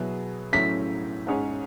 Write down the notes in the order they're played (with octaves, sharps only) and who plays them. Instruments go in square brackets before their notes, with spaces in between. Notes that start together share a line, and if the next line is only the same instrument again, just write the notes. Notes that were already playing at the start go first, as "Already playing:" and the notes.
Already playing: [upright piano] B2 F#3 B3 E4 G#4
[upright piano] A2 F#3 A3 C#4 [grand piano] B6
[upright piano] G#2 G#3 C#4 G#4 C#5